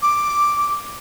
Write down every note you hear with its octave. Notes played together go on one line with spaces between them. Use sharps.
D6